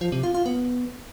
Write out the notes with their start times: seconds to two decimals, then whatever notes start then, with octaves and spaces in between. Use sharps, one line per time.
0.01 F3
0.12 C3
0.23 F4
0.34 F4
0.46 B3